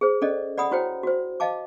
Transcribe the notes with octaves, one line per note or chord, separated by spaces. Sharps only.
G#4 C5
C#4 A4 D5 D#5
D5 F#5 B5 D#6
E4 F#4 C5 C#5 G5
F#4 C5
D#5 F5 A5 D6